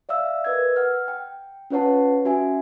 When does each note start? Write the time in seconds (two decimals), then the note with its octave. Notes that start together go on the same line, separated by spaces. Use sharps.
0.09 D5 E5 F5 E6
0.44 A#4 B4 D#5 E6 G#6
0.76 F#5 F6
1.08 G5
1.70 C#4 F4 B4 C#5 F#5 A5
2.25 C#4 F#4 E5 G#5